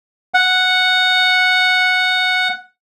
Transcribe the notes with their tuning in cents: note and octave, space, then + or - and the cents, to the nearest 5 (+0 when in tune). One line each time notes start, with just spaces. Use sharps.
F#5 -5